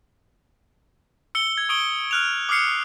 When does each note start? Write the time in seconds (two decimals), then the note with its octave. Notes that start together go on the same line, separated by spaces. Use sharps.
1.35 E6 C#7 G7
1.58 G#6
1.69 C#6 D#6 D7 G7
2.11 F6 F#6 F7
2.49 D6 D#6 F6 C7 C#7